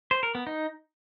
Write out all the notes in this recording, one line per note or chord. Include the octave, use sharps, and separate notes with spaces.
C5
A#4
B3
D#4